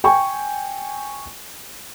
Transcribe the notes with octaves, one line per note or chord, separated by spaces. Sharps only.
G5 G#5 C#6